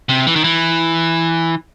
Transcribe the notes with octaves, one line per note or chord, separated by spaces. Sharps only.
C3
E3
D#3
E3